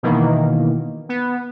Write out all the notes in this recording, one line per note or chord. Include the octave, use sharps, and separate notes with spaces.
B2 D#3 E3 A#3
B3